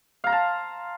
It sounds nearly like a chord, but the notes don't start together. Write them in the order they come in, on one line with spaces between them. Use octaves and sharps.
F5 A#5 C6 A5